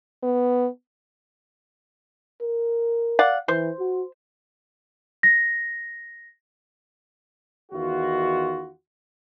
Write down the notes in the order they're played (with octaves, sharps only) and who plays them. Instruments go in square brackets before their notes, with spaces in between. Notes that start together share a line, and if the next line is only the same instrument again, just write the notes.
[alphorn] B3
[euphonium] A#4
[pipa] D5 F5 F#5
[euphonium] E3 [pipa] C5
[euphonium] F#4
[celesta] A#6
[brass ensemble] E2 D#3 F4 F#4